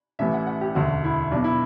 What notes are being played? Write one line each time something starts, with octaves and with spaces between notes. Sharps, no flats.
A1 A2 E3 E5
F#5
F#5
G4
E1 D2 D3 F#4
E4
B1 B2 D4
E4